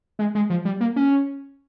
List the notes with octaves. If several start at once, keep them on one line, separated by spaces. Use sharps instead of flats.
G#3
G#3
F3
G3
A#3
C#4